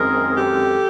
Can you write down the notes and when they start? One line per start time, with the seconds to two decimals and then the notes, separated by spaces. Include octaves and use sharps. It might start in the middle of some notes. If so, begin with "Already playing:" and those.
Already playing: F#2 D#3 G#3 C4 G#4 A#4
0.36 G4 A4